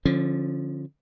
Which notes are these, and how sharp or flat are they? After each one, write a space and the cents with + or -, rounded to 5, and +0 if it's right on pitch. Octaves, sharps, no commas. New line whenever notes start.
D3 +0 F3 +0 C#4 -35